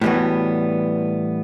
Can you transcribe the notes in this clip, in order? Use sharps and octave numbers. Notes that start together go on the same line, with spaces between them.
A2 E3 G3 B3 F#4